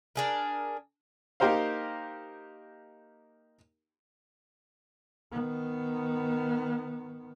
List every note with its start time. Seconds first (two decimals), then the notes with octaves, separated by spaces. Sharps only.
0.16 D4 G#4 A#4
1.40 A#3 D#4 G4 A#4 C5 F5
5.32 D#3 B3